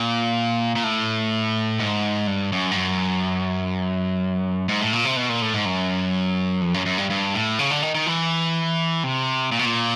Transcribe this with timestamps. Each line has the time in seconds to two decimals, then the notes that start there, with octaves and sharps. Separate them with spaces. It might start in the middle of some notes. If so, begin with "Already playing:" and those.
Already playing: A#2
0.76 A#2
0.84 A2
1.80 G#2
2.27 G2
2.52 F#2
2.71 G2
2.76 F#2
4.69 G#2
4.81 A2
4.93 A#2
5.04 C3
5.16 B2
5.29 A#2
5.42 A2
5.54 G#2
5.65 F#2
6.61 F2
6.74 F#2
6.86 F#2
6.98 G2
7.10 G2
7.35 A2
7.59 C#3
7.71 D3
7.83 D#3
7.95 D#3
8.06 E3
9.04 C3
9.52 A#2
9.59 B2
9.65 A#2